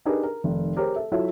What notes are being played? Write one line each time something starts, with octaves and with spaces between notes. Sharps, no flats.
D4 D#4 G4 G#4 A#4 B4
A#4
F1 D#3
G4 G#4 A#4 C5 C#5
A4 E5
F#3 E4 F4 A4 C#5 E5